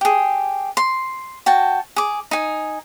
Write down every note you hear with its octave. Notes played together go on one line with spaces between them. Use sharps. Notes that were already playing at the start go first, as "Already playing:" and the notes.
G4 G#4
C6
F#4 G5 A5
G#4 D6
D#4 G#5